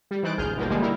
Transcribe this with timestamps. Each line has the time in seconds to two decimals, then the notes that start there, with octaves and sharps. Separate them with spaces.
0.11 G3
0.23 E3 D#4 C5 F#6 A6 D7
0.37 G#1 D2 G#4 F6 G6
0.57 B2 D#3 F3 G3 A#3
0.70 A#2 D3 F3 G3 G#3 A#3
0.82 D#3 G3 E4 A#4